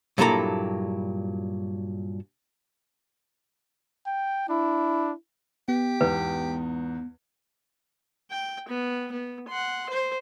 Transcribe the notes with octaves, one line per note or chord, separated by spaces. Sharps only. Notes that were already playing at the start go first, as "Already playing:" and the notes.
G2 A#2 F#3 E4 A4 A#5
G5
D4 E4
B3 G4
E2 G#2 B4
G5
B3
B3
F#5 C6
C5